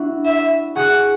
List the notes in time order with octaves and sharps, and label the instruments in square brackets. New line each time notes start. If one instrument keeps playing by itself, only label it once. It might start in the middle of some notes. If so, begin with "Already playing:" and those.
Already playing: [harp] D4 E4 F#4
[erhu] E5
[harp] F#4 G#4 [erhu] F#5